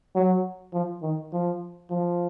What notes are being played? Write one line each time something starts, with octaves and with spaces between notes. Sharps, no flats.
F#3
F3
D#3
F3
F3